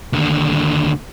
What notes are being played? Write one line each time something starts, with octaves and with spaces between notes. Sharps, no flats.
D#2 D3